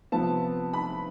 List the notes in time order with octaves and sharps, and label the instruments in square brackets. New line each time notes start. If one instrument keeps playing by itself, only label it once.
[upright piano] C3 F3 B3 A5
B5